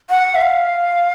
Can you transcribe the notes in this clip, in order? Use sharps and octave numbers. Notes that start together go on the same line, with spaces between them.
F#5
E5
F5